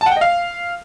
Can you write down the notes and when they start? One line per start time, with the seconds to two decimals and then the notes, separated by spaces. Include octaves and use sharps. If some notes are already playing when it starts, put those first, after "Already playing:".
0.01 A5
0.06 F#5
0.11 G5
0.16 D#5
0.21 F5